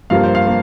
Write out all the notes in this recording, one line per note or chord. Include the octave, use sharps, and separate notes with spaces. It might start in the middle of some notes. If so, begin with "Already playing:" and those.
G2 F3 A#3 F5
C5
F5
A#3